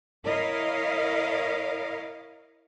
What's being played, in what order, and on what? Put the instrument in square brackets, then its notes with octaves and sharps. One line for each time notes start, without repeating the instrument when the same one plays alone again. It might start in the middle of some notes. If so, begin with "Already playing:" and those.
[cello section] E4 A#4 C#5 D#5 F5